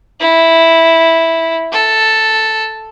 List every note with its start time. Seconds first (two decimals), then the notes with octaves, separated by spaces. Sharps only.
0.20 E4
1.72 A4